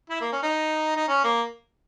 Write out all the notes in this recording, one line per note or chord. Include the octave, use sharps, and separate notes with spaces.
E4
A#3
C#4
D#4
D#4
C#4
A#3